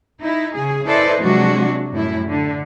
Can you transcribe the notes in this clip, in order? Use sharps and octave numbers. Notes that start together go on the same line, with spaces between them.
D#4 E4
C#3 G#4
E4 A4 B4 C5 D5 D#5
C3 F3 F#3 G#3 D4 F#4
F#2 A2 G3 E4
D3